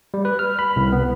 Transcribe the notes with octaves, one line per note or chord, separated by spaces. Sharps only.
G3
B4
F6
B5
C2
B3